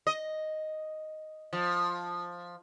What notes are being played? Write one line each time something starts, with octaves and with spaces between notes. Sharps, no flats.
D#5
F3